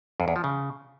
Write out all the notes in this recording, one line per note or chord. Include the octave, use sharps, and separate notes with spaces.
F2
E2
F3
C#3